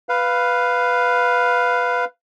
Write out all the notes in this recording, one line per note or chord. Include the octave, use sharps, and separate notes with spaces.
B4 F5